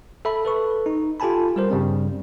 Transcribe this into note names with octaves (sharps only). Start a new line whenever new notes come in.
A4 E5 B5
A4 B4 C#6
D#4
F4 G4 A4 G#5 A5 B5
G3 G4 A#4 C5
G2 C#3 G3 C4